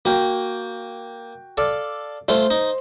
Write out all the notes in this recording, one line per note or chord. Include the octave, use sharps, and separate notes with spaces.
A#3 F#4 G5
A4 D5 F5
A3 F4 C5 C6
D#4